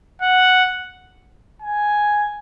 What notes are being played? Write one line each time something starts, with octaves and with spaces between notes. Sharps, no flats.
F#5
G#5